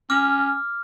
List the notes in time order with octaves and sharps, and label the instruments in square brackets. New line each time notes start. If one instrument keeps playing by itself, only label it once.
[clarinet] C#4 [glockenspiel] D6 F6